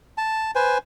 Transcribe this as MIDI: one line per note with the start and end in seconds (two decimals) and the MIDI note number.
0.18 0.51 81
0.55 0.78 71
0.55 0.78 72
0.55 0.78 80